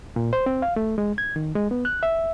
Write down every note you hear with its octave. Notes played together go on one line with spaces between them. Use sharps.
A#2
C5
C4
F5
A3
G#3
G#6
D#3
G#3
B3
F#6
E5